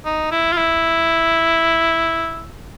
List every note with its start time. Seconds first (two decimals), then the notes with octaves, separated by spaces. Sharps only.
0.05 D#4
0.31 E4
0.52 F4
0.57 E4